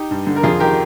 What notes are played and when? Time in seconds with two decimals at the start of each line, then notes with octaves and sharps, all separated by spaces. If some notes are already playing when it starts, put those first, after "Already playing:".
Already playing: D#4 G4
0.11 G2
0.27 D3
0.36 A#4
0.43 F2 F4 G#4
0.60 D#3 G4 A#4